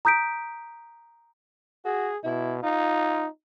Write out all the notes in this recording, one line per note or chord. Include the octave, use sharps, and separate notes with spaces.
A#5 D#6 G6 B6 D7
F#4 G#4
B2 E4
D#4 F4